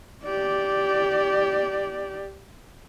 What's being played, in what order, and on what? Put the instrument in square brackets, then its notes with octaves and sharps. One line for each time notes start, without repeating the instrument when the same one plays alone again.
[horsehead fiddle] G4 D5